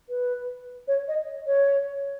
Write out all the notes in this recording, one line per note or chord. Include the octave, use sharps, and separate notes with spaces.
B4
C#5
D#5
C#5